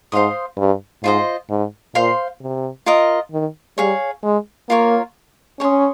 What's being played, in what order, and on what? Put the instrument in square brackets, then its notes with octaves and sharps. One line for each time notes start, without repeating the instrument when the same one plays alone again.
[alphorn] G#2 [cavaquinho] C5 F5 C6 D#6
[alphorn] G2
[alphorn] G#2 [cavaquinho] F4 C5 D#5
[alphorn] G#2
[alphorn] A#2 [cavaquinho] C5 F5 C6
[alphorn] C3
[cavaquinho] F4 A#4 D#5
[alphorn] D#3
[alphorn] G3 [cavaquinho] G#4 C#5 F5
[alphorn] G#3
[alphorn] A#3 [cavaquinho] F4 A#4 C#5
[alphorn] C#4 [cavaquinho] C#5 G#5 C6 D#6